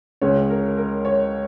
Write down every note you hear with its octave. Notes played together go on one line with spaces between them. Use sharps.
C#2 C#3 G#3 C#5
A#4
A#4
C#5